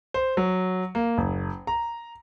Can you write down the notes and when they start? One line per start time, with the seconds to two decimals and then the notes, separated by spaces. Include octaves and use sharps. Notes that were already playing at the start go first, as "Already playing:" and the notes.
0.14 C5
0.37 F#3
0.95 A#3
1.18 F#1
1.67 A#5